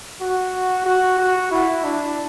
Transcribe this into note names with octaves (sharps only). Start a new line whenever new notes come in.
F#4
F#4
F#4
E4
D4